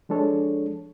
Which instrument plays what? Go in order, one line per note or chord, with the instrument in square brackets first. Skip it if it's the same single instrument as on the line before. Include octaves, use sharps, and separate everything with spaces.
[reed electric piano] F3 G#3 D4 A4 C#5